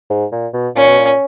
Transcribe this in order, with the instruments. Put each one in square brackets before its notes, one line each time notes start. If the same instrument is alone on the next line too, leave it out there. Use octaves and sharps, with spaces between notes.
[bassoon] G#2
A#2
B2
[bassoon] A#2 [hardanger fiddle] C#4
[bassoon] B2
A#2